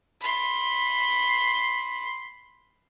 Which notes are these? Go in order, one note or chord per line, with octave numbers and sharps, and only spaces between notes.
B5 C6